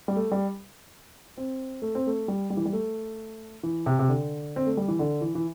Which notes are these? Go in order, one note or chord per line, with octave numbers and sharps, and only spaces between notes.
G3
A3
G3
C4
A3
C4
A3
G3
G3
E3
G3
A3
E3
C3
C3
D3
C4
A3
G3
E3
D3
E3
E3